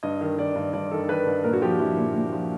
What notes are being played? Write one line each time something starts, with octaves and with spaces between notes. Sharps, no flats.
G2 D#5
D#3
D#3 D5
G2
G2 D5
D#3 A4
D#3 B4
G2
A#2 A#4
F#4
F3 G4
F3 E4
A#2
A#2
F3